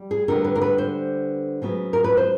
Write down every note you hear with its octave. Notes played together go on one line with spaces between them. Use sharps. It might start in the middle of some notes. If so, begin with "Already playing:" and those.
Already playing: G3
G#4
D3 G3 B3 A#4
B4
A#4
B4
C5
C#3 F#3 B3
A#4
B4
C5